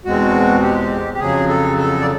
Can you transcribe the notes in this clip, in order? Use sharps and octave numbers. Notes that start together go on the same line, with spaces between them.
E2 B2 G#3 C4 F#4
G4
G4
F2 C#3 F#3 G#4
A4
A4
D5